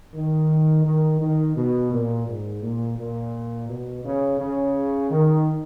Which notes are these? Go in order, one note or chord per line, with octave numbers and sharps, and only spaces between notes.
D#3
D#3
D#3
B2
A#2
G#2
A#2
A#2
B2
C#3
C#3
D#3